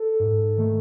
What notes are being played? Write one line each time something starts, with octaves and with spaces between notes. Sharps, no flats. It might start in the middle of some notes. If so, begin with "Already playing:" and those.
Already playing: A4
G#2
D#3 A3